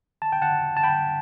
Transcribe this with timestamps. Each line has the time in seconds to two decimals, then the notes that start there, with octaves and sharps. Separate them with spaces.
0.22 A5
0.32 G5
0.42 F#5 A5
0.77 A5
0.83 G5 B5